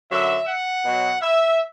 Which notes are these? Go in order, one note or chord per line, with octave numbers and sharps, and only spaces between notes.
F#2 D3 F#3 E5
F#5
B2 F#3
E5